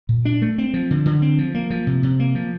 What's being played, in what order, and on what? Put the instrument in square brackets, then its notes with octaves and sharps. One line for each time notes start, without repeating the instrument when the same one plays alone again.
[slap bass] A#2
D4
A3
C4
F3
D3
D3
C4
F3
A#3
F3
C3
C3
A#3
F3